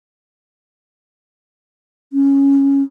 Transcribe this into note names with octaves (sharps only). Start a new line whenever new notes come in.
C#4